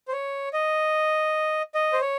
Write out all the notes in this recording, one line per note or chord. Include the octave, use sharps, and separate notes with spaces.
C5
C#5
D#5
D#5
C5
C#5